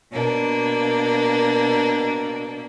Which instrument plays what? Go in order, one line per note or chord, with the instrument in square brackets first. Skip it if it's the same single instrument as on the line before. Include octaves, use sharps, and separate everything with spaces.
[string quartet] B2 A#3 D4